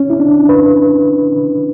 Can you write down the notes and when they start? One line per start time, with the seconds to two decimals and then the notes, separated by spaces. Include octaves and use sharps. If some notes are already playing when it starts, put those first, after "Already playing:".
Already playing: C#4
0.10 E4
0.20 D4
0.49 B4